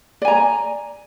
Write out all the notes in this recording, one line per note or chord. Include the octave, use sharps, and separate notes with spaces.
D5 G#5 A#5